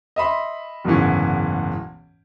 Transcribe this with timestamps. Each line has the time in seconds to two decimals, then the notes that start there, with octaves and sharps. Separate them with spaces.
0.16 D#5 E5 B5 C6
0.85 F#1 D2 G#2 B2 E3 C#4